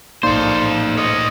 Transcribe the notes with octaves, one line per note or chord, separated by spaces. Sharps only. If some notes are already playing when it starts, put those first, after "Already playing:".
A#1 A2 A#3 D#4 A4 C5 D5 C6
C#5 D#5